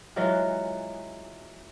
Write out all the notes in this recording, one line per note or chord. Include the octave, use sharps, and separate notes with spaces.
E3 F#3 G#3 F4